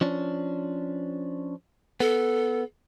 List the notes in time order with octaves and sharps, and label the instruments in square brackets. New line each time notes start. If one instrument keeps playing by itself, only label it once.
[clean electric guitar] F3 C#4 D4
[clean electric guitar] B3 [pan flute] A4